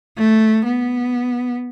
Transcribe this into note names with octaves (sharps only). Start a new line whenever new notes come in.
A3
B3